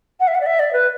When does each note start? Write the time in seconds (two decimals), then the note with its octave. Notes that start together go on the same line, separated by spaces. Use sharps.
0.20 F#5
0.27 E5
0.34 F#5
0.40 D5
0.46 E5
0.59 D5
0.73 B4